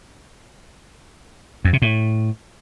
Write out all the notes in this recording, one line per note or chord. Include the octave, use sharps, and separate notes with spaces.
F2
C3
A2